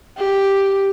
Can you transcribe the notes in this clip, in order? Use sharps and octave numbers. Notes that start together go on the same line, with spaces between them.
G4